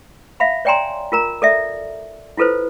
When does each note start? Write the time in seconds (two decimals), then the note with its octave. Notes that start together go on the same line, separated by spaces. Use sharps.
0.40 E5 F5 B5
0.65 C#5 D5 G5 G#5 A#5 C6
1.12 F4 A#4 A#5
1.42 A4 D5 E5
2.37 E4 F4 A4 B4 C5